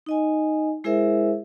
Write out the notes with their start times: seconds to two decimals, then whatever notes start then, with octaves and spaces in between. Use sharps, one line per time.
0.06 D#4 D#5 G#5
0.84 G#3 E4 G#4 A#4 C5 E5